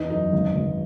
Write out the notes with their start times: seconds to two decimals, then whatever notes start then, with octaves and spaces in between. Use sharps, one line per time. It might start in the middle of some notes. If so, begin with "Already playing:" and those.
Already playing: E2 E3 D#4
0.10 F#2 D#4
0.32 G#1
0.55 G#1